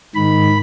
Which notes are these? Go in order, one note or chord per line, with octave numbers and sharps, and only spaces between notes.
G#2 D#3 B5